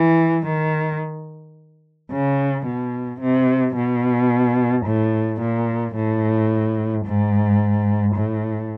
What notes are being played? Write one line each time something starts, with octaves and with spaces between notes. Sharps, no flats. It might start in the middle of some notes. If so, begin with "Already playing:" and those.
Already playing: E3
D#3
C#3
B2
C3
B2
A2
A#2
A2
G#2
A2